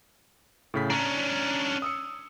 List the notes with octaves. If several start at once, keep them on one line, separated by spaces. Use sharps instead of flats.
A2 C#3 B6
C#4 D4 A#5
D#6 E6 C#7